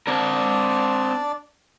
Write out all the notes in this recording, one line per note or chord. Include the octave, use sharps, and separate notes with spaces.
C4 D4 A#4 D5